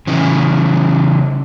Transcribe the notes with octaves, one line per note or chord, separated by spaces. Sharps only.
C#3 E3